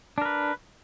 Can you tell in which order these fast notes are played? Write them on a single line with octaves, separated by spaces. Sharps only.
D4 A#4 B4